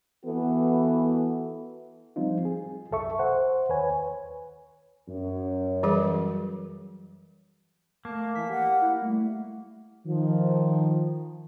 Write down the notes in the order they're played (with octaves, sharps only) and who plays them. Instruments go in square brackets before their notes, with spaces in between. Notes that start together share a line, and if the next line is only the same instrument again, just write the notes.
[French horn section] E3 B3 F#4 A4
[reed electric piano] F3 G3 C4 D#4 F4
G#4
C2 F#2 A4 E5 C#6
C5 F#5
D#2 B4 C#5 G#5
[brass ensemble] F#2
[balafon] E3 G3 G#4
[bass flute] A3 [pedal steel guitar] A#3 [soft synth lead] A5
[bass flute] E3 [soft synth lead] B6
[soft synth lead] G4 [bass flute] F#5
[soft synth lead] E4
[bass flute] G3 [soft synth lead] A3
[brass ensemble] D#3 F3